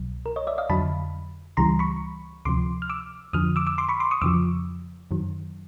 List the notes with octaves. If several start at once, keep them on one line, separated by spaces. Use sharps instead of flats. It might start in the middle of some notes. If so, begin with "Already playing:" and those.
Already playing: C2 B2 F#3
A#4
C#5 D#5
D5 E5
D#5 F5
F2 D3 F#3 A5 B5
C#2 C#3 E3 G3 A#5 C6
B5 C#6
D2 C3 F3 C6 D6
F6
D6 E6
F2 D3 F3 D#6 F6
D6 E6
D6 E6
C6 D6
B5 C#6
C6 D6
C#6 D#6
F2 C#3 F3 D6 E6
F#2 D#3 F#3